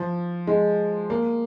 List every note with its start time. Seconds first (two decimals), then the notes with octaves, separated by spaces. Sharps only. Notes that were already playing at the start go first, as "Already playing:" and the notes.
Already playing: F3
0.47 G#3
1.10 A#3